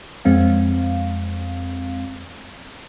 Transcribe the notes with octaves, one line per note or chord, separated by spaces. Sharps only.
F2 G#3 C4 F5